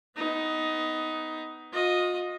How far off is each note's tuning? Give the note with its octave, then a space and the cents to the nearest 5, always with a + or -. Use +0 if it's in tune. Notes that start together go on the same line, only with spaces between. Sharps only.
B3 +20 D#4 +15
F4 +40 D#5 +0